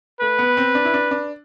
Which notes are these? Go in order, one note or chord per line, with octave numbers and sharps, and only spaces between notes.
A3 B4
B3
C4
D4
E4
D4
D4